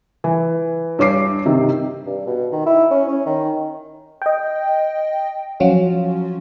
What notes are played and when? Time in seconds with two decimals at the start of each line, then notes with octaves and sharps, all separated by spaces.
0.24 E3
0.99 G2 C#5 D6 C7
1.46 C3 D#3
2.06 G2
2.26 B2
2.52 D#3
2.66 E4
2.91 C#4
3.08 C#4
3.26 D#3
4.22 D#5 G5
5.60 F3 F#3 C#4 F4 F#4